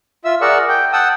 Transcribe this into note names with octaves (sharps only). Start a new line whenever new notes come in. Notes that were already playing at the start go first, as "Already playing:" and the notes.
F4 E5 E6
G#4 A#4 D5 F#5 C#6 E6
G5
F#5 G5 A5 D#6 E6